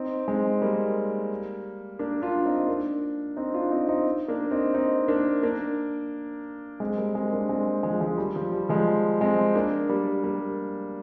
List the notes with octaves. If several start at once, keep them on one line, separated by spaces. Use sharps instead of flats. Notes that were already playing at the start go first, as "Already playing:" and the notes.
Already playing: C4 D#4
G#3 C4
G3 A#3
A#3 D4
D4 F4
C4 D#4
A#3 D4
C4 D#4
D4 F4
C4 D#4
C4 D#4
A#3 D4
C4 D#4
C4 D#4
A#3 D4
A#3 D4
G#3 C4
G3 A#3
G#3 C4
A#3 D4
G#3 C4
F3 G#3
F3 G#3
G3
F3
G3
F3 G#3
G#3 C4
A#3 D4
G3 A#3
G3 A#3